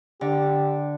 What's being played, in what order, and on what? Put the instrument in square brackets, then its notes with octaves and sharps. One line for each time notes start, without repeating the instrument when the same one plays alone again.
[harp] D3 [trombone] G4